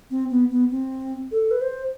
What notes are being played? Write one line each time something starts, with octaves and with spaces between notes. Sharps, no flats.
C4
B3
B3
C4
A4
B4
C5